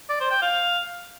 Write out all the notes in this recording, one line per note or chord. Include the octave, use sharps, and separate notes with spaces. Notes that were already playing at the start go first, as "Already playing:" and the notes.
D5
C5
G5
F5